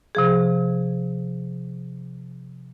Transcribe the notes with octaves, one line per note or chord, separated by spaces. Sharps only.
C3 F3 G#4